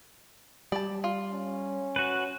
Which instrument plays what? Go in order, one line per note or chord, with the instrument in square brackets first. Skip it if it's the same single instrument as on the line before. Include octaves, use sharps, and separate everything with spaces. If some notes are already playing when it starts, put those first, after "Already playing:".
[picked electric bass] G3 [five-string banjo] D5 A5
[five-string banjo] F4
[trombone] C#4
[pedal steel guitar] F#4 B4